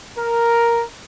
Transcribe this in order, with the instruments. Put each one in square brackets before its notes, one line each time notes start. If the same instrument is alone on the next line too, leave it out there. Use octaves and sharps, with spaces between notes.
[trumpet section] A#4